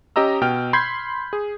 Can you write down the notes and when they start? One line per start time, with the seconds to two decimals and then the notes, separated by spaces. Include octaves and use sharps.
0.16 C#4 G4 D#5 A#5 E6
0.41 B2 G5 F6
0.73 B5 C6 G6 G#6 B6 C7
1.33 G#4